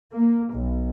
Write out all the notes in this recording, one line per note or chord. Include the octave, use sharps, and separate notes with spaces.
A#3
B1